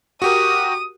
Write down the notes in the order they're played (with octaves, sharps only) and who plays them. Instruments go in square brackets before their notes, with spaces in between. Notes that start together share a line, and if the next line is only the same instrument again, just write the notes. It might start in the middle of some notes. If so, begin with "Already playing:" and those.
[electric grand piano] F#4 G4 A#4 [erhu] D#6